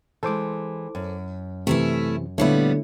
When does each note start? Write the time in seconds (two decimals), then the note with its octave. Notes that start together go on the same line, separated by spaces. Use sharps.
0.23 E3 G#3 A4 C5 D6
0.95 F#2
1.67 C3 E3 A3 C#4 E4
2.38 A#2 D3 G3 A3 B3 E4 C#5